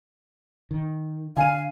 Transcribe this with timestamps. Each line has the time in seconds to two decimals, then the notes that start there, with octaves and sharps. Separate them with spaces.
0.71 D#3
1.37 D3 D4 F5 G#5 D#7